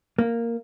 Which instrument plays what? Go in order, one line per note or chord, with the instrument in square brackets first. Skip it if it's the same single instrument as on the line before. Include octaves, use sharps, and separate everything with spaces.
[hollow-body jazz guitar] A#3